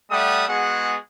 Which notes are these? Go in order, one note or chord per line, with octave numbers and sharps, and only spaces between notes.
G3 A3 E5 F#5 D#6
G#3 B3 F#4 G#4 F#5